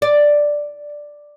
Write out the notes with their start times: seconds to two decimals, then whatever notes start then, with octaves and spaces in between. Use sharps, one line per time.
0.02 D5